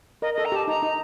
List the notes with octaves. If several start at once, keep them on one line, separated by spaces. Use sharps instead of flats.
A#4 D#5
D#5
A4
A#5
G4 A5
D#4 A#5
D#4